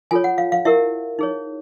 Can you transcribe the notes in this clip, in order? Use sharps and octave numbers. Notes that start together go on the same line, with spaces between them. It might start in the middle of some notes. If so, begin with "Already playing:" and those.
F4 A4 C#5 G#5
F#5
F5
F5
E4 G4 A#4 E5
D#4 G#4 C#5